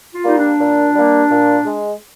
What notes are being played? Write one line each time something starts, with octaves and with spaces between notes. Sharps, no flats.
F4
G3 A#3 D#4
D4
A#2
G3 A#3
A#2
G#3